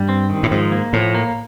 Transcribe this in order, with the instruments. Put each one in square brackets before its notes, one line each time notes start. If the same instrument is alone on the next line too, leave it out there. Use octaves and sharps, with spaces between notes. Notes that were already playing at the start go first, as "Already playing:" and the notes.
Already playing: [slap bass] G2 [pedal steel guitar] G3
[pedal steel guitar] C4
D#3
[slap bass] A2
[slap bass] G#2 [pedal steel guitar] F3
[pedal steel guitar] A#3
[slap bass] A2 [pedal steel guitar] F3
[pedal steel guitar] A#3